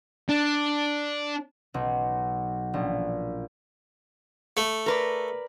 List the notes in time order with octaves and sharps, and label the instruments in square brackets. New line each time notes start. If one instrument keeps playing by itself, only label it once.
[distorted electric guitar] D4
[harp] B1
A#1
[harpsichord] A3
[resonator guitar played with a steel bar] A#4 B4 D5